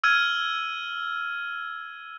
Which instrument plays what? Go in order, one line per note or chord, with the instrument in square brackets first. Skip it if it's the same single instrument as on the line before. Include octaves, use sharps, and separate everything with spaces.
[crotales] E6 F6 G#6 D#7